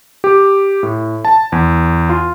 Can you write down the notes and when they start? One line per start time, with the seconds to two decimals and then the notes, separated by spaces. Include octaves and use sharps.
0.24 G4
0.83 A2
1.25 A5
1.52 E2
2.09 F4